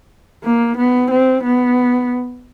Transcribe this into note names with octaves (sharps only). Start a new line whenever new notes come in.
A#3
B3
C4
B3